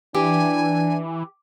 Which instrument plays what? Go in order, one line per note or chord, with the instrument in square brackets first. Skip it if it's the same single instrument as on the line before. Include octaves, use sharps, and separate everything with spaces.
[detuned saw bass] E3 [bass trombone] D4 [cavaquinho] G4 [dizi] G#5